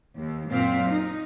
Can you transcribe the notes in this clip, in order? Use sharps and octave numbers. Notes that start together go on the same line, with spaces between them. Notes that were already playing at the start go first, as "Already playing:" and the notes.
D#2
F#2 A#2 C4 F5
D#4